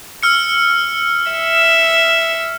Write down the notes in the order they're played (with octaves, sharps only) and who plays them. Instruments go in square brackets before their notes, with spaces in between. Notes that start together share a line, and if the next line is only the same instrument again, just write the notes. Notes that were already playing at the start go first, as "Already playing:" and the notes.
[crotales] E6 F6 C#7
[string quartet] E5